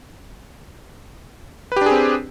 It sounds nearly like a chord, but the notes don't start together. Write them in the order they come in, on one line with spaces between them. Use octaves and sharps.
B4 G4 D4 G#4 C4